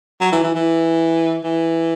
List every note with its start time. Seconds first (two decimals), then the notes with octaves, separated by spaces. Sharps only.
0.21 F#3
0.32 E3
0.43 E3
0.55 E3
1.44 E3